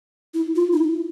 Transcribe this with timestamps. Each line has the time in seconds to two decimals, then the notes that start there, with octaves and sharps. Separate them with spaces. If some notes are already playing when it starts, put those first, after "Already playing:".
0.34 E4
0.56 F4
0.73 D#4
0.77 E4